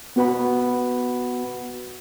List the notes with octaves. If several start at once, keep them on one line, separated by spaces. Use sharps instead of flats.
B3 F#4 B4 F#5 B5